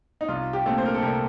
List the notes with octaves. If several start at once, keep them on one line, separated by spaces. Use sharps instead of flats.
D#4
C2 F4
G4
A#2 A3 C4
C5
A#4
A4
C2 A#4